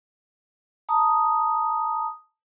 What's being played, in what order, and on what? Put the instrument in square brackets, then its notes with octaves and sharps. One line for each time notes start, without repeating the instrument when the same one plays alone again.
[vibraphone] A5 A#5 D#6